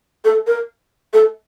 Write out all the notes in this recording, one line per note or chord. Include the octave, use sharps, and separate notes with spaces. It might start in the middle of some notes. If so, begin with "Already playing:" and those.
A4
A#4
A4